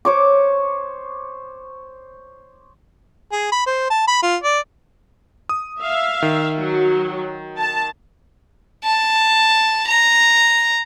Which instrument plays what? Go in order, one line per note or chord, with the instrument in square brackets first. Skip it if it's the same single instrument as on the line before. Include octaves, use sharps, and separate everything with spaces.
[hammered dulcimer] C5 C#5 D6
[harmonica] G#4
B5
C5
A5
B5
F4
D5
[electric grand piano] D#6
[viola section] E5 F5
[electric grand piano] D#3
[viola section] F#3
A5
[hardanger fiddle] A5
A#5